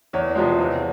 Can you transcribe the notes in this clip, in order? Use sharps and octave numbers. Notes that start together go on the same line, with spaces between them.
E2 C#5
C3 F3 G#3
E2